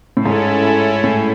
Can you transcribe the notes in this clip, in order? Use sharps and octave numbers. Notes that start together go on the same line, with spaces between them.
A2
G#2 C#4 E4 A4
A2